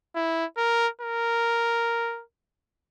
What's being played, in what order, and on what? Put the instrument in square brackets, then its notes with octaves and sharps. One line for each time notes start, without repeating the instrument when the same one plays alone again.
[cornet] E4
A#4
A#4